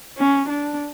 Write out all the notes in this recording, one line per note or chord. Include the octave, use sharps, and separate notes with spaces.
C#4
D4